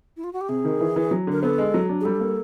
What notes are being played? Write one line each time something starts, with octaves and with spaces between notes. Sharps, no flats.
E4
F4
F#4
G4
C3 G#4
D#3
E3
E3
F#3
D3 A#4
B3 A4
G#3
F#3
D4
G#4
G3 A4
A#3